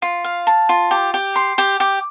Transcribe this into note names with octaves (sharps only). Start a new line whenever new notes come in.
F4
F5
A5
F4
G4
G4
C6
G4
G4